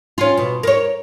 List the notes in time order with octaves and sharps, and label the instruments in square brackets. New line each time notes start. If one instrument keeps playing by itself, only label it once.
[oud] C#4 F4
B2
A#4 C#5